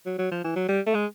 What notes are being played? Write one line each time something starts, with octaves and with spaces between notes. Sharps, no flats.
F#3
F#3
F3
E3
F#3
G3
A3
G#3